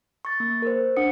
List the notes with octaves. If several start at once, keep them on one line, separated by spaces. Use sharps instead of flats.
C#6 A6
A#3
A#4 C5
D4 F#5 D#6 C#7